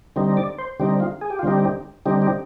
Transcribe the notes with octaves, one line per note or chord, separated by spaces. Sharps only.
D3 G3 C4 D#4
D5
C5
D3 G3 C4 D#4 G4
F4
G#4
G4
F4
D3 G3 C4 D#4 G4
D3 G3 C4 D#4 G4
G4